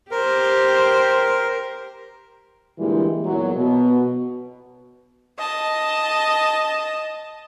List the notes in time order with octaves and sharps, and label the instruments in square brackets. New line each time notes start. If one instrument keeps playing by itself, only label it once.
[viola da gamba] G4 C5 [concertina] A#4
[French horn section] A#2 D3 E3 G3 G#3
E2 A#2 F#3
B2
[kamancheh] D#5 A5